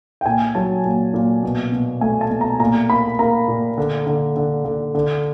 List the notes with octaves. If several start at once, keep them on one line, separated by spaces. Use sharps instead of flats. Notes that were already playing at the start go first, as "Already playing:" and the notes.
G5
A#2 G#5
F#3 A5
A#2
A#2
B2
B2
A3 G#5
A5
B2
A#5
A#2 A#5
A#3 B5
A#3 A#5
A#2
D3
D3
D3
D3
D3